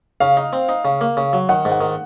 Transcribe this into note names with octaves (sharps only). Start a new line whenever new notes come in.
C#3 F5
D#4
C4
D#4
C#3
A#3
C#3
F#3
D#3 F#5
G#2
F#5
D#3